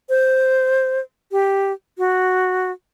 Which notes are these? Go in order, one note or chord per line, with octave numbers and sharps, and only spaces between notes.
C5
G4
F#4